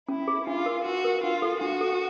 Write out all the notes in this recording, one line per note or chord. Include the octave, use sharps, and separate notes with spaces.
C#4 E4
G#4
D4 F4
A#4
D4 F#4
A#4
D4 F4
A4
D4 F#4
A4